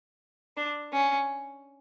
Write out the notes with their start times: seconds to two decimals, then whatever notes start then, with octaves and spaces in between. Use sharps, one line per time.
0.57 D4
0.92 C#4